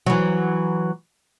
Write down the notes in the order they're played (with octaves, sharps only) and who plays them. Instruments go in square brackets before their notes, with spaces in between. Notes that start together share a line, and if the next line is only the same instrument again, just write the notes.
[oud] E3 F#3